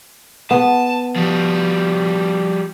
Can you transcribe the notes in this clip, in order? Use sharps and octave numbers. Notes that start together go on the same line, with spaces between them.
B3 A5
F3 G3